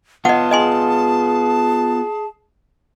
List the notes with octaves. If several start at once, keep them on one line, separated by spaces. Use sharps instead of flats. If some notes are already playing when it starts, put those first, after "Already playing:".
B3 F4 D#5 F#5 A5
G#4 D#5 G#5 C6